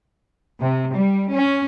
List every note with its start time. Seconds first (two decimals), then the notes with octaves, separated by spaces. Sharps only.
0.59 C3
0.92 G3
1.31 C#4